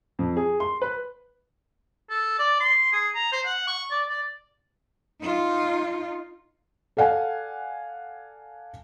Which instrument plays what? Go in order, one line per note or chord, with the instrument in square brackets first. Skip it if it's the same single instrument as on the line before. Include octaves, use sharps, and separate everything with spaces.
[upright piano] F2
G#4
C6
B4
[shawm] A4
D5
C6
G#4
A#5
C5
F#5
C#6
D5
D5
[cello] D#4 F4
[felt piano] A4 D5 F5 F#5 G#5